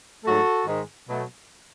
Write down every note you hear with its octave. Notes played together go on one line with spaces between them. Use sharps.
G#2 F#3 A3 F#4 A4
G#2 D#3 G#3
B2 F#3 A3